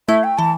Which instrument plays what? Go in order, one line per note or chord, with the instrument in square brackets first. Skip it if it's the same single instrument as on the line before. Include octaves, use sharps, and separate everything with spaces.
[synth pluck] A3 E4 [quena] E5
[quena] G5
[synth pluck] E3 [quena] A5